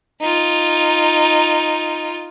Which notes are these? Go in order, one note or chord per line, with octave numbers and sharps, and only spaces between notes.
D#4 F4